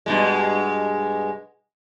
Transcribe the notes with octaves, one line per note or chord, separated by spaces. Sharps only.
G2 B2 G#3